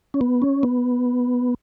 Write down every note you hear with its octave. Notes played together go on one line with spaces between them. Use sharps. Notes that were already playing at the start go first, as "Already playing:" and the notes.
C#4
B3
C#4
B3